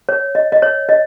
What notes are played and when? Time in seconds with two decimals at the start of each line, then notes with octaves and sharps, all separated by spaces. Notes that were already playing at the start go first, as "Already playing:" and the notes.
0.09 C#5
0.35 D#5
0.52 D#5
0.62 C#5
0.89 D#5